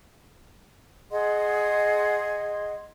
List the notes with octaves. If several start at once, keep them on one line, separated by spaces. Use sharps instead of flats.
G#4 D#5 F#5 C6